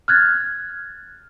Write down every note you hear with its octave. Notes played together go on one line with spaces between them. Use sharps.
F6 F#6 G#6 A6